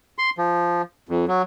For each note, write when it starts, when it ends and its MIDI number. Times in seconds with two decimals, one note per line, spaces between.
0.18 0.30 84
0.38 0.82 53
1.09 1.25 41
1.28 1.42 54